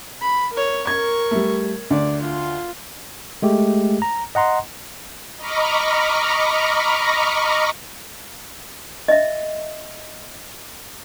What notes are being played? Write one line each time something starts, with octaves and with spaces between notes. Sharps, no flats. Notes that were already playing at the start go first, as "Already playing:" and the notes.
B5
A#4 C#5
A#4 C#6 G#6
G3 A3
D2 D5
F4
G#3 A3 G4
A#5
D#5 F#5 A#5 C6
D#5 A#5 B5 C#6 D6 F6
D#5 E5